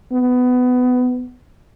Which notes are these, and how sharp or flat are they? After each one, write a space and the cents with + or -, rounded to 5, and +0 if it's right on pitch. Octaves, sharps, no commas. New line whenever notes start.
B3 +20